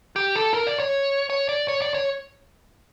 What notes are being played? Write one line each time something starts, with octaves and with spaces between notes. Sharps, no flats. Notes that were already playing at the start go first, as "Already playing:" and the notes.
G4
A4
A#4
D5
C#5
C#5
D5
C#5
D5
C#5